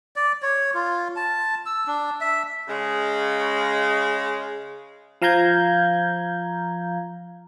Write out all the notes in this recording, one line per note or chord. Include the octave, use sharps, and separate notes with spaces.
D5
C#5
F4
A5
E6
D4
E5
C#3 G#3
F3 F5 A#5 G6 G#6